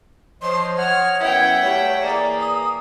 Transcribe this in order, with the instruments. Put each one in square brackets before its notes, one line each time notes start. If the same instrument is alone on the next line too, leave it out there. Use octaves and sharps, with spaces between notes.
[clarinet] F3 [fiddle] C5 [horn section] C#5 D#5 [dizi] C6
[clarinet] F#5 [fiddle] F6 [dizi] G#6
[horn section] F#2 B3 E4 [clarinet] E5 [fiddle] F#5 G5 [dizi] G#6
[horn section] G3 A3 [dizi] C#5
[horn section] E3 G#4 [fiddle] A#3 [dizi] D5
[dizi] D#6